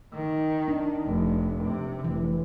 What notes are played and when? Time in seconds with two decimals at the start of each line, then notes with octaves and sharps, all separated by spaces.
0.13 D#3
0.68 D4
1.06 F1
1.64 C3
2.04 F1 E3